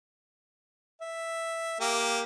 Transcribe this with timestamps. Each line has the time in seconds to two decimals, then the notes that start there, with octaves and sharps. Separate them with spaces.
1.01 E5
1.80 A#3 G4